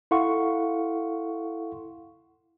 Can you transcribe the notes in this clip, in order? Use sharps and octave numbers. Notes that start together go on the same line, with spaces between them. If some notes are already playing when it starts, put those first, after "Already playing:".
E4 A4 F5 F#5 C6 C#6